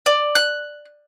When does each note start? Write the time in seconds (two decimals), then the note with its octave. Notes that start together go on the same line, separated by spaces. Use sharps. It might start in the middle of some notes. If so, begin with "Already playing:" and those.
0.06 D5
0.35 F#6